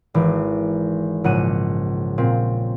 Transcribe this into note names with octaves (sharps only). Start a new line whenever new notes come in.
G#1 E3
A#1 G#2 C#3 F#5 C#7 D#7
A#2 C4